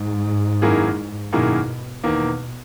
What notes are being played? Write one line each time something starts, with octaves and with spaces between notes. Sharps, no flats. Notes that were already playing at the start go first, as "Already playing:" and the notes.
Already playing: G#2
F#2 D#3 A#3 E4 G#4
F#2 B2 D#3 A#3 E4 G#4
E2 B2 D#3 A#3